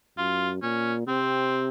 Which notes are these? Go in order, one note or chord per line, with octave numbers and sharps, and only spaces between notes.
F#2 F4
A#2 C#4
C3 C4